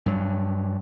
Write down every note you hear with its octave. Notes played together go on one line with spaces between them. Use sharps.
G2 F#3